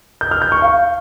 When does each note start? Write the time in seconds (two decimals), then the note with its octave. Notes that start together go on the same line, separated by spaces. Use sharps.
0.21 G6
0.31 F6
0.42 G6
0.52 C#6
0.62 F5